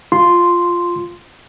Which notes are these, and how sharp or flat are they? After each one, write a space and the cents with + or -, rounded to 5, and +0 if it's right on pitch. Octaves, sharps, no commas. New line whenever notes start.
F4 +0 C6 -5